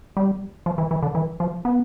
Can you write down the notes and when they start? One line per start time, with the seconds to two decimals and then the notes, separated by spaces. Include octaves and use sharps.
0.17 G3
0.66 F3
0.78 E3
0.91 E3
1.03 D3
1.15 E3
1.40 F3
1.65 B3